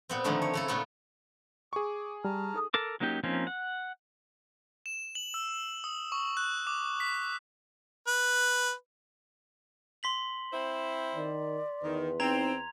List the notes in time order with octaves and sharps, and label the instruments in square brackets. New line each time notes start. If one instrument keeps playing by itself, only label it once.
[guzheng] A#2 B3 C4
D3 D#3 F3 A3 A#3
C#5
C#3 E4 A4
A#2 A3 B3 D#4 F4
[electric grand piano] G#4 C#6 [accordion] D6
[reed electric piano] G3 [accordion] A5 A#5 F6
[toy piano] D#4 A4 D#6
[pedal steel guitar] A4 A#4 D6
F#3 A#3 C#4 D#4 G4
F3 A#3 C4 C#4 D#4
F#5
[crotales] E7
F#7
E6
D#6
C#6
F#6
D6
B6
[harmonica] B4
[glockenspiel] C6 B6 F#7
[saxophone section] C4 E4 C5
[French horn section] D#3 [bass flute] D5
[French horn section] E2 B4 [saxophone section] D#3
[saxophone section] C4 [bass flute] D#4 [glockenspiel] A#5 G#6 F7